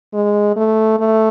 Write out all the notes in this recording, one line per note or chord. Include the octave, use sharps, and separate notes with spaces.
G#3
A3
A3